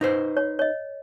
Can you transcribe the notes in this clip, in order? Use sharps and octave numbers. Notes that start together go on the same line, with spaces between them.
D#4 B4 C5
C#5
C#5 D#5